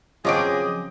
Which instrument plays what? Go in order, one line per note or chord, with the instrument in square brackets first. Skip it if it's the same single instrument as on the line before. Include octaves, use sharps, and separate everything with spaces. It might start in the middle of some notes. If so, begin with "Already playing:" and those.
[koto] C#3 F#3 C4 [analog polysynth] F3 [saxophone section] G#4 [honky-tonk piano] D#5 D6 D7